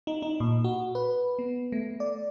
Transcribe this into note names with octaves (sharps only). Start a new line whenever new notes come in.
D#4
D#4
A#2
F#4
B4
B3
A3
D5